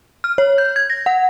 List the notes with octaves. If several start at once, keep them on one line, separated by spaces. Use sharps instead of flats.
F6
C#5
G6
G#6
A#6
F#5